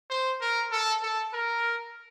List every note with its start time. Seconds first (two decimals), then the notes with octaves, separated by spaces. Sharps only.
0.10 C5
0.41 A#4
0.72 A4
1.03 A4
1.33 A#4